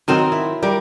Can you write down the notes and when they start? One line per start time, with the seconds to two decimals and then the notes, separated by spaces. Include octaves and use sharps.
0.08 D#3 F#3 C4 D#4 A#4 D#5
0.32 E4
0.63 G3 A#4